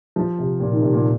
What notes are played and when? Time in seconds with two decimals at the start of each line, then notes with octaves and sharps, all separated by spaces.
0.16 F3
0.38 C3
0.60 A#2
0.71 D#3
0.82 C3
0.93 A#2